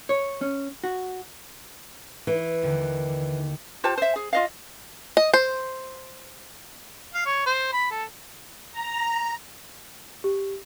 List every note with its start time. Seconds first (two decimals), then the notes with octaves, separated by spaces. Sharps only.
0.09 C#5
0.41 C#4
0.84 F#4
2.27 E3
2.63 D#2 D3
3.84 F4 G4 C5 A5
3.98 C5 E5
4.16 G#4
4.33 F4 D#5 F5
5.17 D#5
5.34 C5
7.14 F5
7.26 C#5
7.46 C5
7.73 B5
7.91 A4
8.71 A#5
10.24 G4